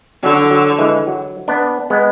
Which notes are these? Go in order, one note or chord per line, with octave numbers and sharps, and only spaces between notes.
D3 F#3
F#3
E3 G#3
F#3
B3 D4
G#3 B3